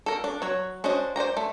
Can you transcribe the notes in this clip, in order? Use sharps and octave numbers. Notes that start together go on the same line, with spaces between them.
A4 A#4
D4
F#3 C#5
C#4 D4 F#4 C5 D#5
C5 D5 G5 A#5
A3